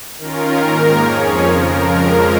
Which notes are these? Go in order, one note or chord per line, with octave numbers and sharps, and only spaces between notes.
D#3 C#4 F4 A#4
G#2 D#3 A#3
F2 F3 C#4 G#4 C#5
F2 C#3 F3 A#4
F2 F3 G#3 C#4